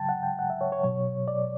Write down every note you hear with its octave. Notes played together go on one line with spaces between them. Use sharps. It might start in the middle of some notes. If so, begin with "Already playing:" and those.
Already playing: C#3 F#3 G5 A5
F#5
G5
F#5
E5
C#5
C#5
B2 F#3 C#5
D5